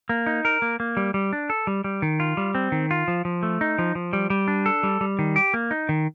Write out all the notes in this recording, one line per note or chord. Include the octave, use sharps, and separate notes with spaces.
A#3
D#4
A#4
A#3
A#3
G3
G3
D4
A4
G3
G3
D#3
F4
G3
C4
D#3
F4
F3
F3
A3
D#4
F3
F3
G3
G3
D4
A4
G3
G3
D#3
G4
A#3
D#4
D#3